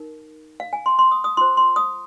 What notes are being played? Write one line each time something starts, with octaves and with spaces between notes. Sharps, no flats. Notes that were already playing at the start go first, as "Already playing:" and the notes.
Already playing: D#4 A#4
F5
G#5
C6
C6
D#6
D#6
F4 C5 C6
C6
D#6